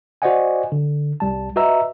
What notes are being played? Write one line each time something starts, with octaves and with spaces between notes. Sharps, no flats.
F#4 C5 D5 D#5 F#5 G#5
D3
C2 G3 A5
F#4 B4 D#5 E5 A#5 E6